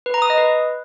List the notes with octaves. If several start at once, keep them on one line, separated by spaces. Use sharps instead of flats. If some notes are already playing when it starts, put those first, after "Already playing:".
B4
A#5
D#6
D#5
B4